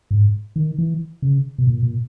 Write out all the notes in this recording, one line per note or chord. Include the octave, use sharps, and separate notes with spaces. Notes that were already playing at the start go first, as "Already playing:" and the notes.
G#2
D#3
E3
C#3
B2
A#2
A#2